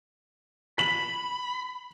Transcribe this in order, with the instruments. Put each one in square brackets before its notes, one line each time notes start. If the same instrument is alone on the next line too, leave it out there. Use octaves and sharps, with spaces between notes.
[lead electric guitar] B5 [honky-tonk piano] B6 F#7